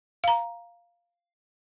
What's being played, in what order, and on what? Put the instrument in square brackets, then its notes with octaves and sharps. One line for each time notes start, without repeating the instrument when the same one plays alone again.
[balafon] F5 A#5